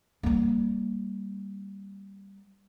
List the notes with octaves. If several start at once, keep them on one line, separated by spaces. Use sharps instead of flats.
G3 A#3